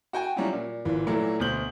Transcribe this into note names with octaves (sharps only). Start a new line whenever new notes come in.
F#4 G5 G#5
F#3 G3 C#4 D4 E4 F4
A#2
G#1 E3 F4
A#2 E3 F#3 A3 A#3
D2 B2 C5 G6 F#7